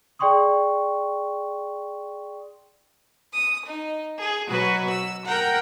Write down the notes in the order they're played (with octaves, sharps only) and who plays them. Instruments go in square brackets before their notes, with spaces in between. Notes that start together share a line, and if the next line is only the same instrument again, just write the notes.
[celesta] G#4 D5 G5 C6 C#6 D#6
[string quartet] D#6
D#4
G#4
B2 F#3 F#4 B4
E6
A#4 F#5 G5 A#5